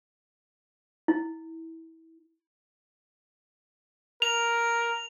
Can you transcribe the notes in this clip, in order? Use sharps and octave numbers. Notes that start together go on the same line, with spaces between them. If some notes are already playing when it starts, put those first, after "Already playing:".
E4
A#4 F7